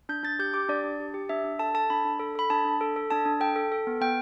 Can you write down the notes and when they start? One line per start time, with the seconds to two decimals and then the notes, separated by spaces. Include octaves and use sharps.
0.09 D4 G6
0.23 D4 A6
0.39 G4 G6
0.54 G4 D6
0.69 D4 D5
0.84 D4
1.00 G4
1.14 G4
1.29 D4 E5
1.44 D4
1.59 A4 A5
1.74 A4 A5
1.90 D4 B5
2.05 D4
2.20 A4
2.35 A4 B5
2.50 D4 A5
2.65 D4
2.81 A4
2.96 A4
3.10 D4 A5
3.25 D4
3.40 A4 G5
3.56 A4
3.72 A4
3.87 B3
4.01 B3 G5